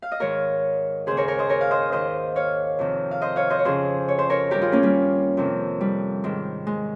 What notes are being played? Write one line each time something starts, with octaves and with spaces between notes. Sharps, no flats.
F5
D#5
G#2 D#3 A#4 C#5
D#2 C#3 G#4 C5
A#4 C#5
A#4 C#5
C5 D#5
A#4 C#5
F5
C5 D#5
D#2 D#3 C5 D#5
C#5 F5
F2 C3 D#3
F5
C5 D#5
C#5 F5
C5 D#5
C#5
F2 C#3 G#4 C5
C#5
C5
A#4 C#5
G2 D#3 G4 A#4
F4 G#4
A#3 C#4
G3 A#3
F2 C3 D#3
G3
G#2 D#3
G#3